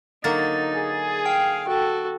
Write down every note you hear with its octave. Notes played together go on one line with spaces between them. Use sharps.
D3 F#3 A#3 D#4 A6
G#4
F5 G5
F#4 A4